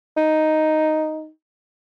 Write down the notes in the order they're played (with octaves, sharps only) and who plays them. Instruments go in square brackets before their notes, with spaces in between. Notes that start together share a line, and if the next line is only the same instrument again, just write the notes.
[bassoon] D#4